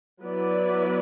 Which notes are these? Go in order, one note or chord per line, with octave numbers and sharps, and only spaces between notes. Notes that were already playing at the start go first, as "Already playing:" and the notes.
F#3 B3 E4 B4 D5